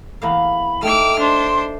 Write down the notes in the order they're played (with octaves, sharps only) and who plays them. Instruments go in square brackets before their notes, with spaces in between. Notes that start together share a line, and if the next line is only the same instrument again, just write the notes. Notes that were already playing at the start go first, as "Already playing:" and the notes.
[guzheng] E2 A#3 F5 [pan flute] B5
[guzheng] A3 D#4 [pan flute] G5 [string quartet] D6 E6 F6
[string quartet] D4 C5 [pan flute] C6